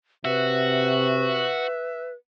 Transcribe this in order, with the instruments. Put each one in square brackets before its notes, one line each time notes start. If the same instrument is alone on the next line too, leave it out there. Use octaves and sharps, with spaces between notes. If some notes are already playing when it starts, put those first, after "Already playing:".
[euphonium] C3 [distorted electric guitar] F#4 [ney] B4 [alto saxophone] E5